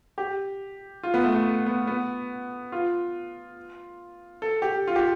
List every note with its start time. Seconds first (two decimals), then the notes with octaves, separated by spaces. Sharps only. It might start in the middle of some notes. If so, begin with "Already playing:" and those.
0.18 G4
1.03 F4
1.14 B3
1.24 A3
1.34 A3
1.66 B3
1.87 B3
2.72 F4
4.42 A4
4.62 G4
4.87 F4
4.96 G4